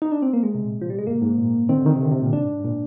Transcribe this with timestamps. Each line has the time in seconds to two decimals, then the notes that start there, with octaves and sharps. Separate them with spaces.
0.02 D#4
0.12 D4
0.22 C4
0.33 A#3
0.43 G#3
0.55 C3
0.64 A#2
0.81 F3
0.90 G3
0.99 G#3
1.07 G#2 A#3
1.22 G#2
1.38 A#2
1.69 D#3 C4
1.77 D3
1.86 D#3
1.96 C3
2.01 D3
2.11 C3
2.22 A#2
2.32 G#2 D4
2.60 G#2
2.64 A#2